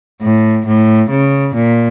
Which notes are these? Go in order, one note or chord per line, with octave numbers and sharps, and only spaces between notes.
A2
A2
C#3
A#2